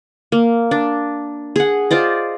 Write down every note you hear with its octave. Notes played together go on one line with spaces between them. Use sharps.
A#3
D4
G#4 F#5
F4 C5 D5 D#5